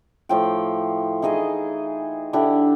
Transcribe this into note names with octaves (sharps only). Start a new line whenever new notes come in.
A2 F3 G5
E3 D#4 G#4 D#5
D3 D4 E4 G4